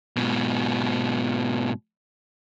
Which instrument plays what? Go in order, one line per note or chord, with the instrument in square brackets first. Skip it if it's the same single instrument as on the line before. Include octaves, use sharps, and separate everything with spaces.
[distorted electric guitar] G#2 B2